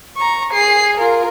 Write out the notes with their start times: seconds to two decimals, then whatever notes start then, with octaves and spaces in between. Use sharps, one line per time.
0.17 A#5 C#6
0.53 G#4 C7
0.97 F4 A#4